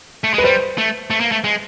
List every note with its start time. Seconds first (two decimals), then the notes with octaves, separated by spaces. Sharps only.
0.24 A3
0.34 G#3 B4
0.44 G3 C5
0.78 A3
1.10 A3
1.20 A#3
1.32 A3
1.44 G#3